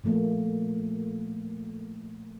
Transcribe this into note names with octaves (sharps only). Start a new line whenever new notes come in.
A#2 F3 A3 A#3